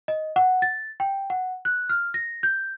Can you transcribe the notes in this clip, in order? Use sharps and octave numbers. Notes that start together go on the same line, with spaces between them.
D#5
F#5
A6
G5
F#5
F#6
F6
A#6
G6